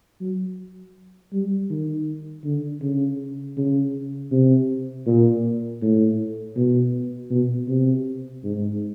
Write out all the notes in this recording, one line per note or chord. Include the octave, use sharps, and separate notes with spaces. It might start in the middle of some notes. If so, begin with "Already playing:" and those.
F#3
G3
D#3
D3
C#3
C#3
C3
A#2
A2
B2
B2
C3
G#2